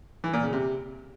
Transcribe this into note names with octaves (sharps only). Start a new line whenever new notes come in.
E3
A#2
C#3
C3